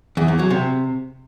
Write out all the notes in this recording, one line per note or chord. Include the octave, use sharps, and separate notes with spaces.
E2
E2
F#3
C3